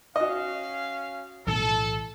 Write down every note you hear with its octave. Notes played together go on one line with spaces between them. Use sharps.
C#4 F#4 D#5 F5
B1 A2 E3 A4